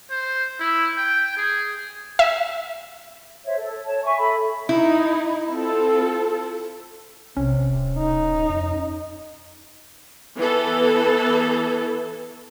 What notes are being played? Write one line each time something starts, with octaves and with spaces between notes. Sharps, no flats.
C5
E4
G5
G#4
E5
C5 C#5 E5
A4
A4
C#5 A5
E5 G#5 C#6
A4 E5 B5
D#4 E4
C4 F4 A4
B1 C3 C#4
D1
D#4
F2
E3 B3 A4